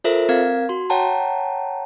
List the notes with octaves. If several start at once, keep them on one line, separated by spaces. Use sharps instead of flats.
F4 A4 A#4 C5 E5
C4 A#4 F5 G#6
F#4 C6
C#5 F#5 G5 A5 A#5